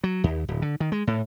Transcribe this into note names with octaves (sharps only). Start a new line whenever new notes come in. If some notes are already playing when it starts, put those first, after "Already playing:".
F#3
D#2
D1
D3
D#3
G#3
A2